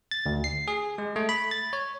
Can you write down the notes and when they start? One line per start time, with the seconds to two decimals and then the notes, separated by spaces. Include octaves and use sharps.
0.11 A6
0.26 D2
0.44 C7
0.68 G#4
0.98 G#3
1.16 A3
1.29 B5
1.51 A6
1.73 C#5